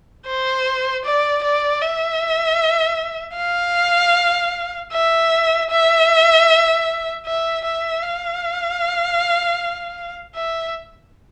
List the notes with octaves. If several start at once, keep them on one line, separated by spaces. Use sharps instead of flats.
C5
D5
D5
E5
F5
E5
E5
E5
E5
F5
E5